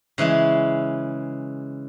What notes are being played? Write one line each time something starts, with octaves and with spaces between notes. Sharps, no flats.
C#3 E3 G#3 E4